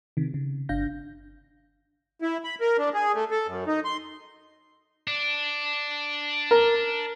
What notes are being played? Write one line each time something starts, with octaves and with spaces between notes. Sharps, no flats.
C3 D#3
C#3
G1 D4 F5 G6 A#6
E4
B5
A#4
D4
G#4
A3
A4
F#2
D#4
C6
D4
A#4